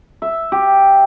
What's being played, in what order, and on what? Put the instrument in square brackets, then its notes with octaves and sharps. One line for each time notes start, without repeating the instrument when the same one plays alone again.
[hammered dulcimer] E5
G4